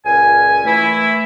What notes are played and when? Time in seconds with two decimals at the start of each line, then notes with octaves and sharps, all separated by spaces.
0.05 C#2 A#2 C#4 G#5
0.65 E3 A3 E4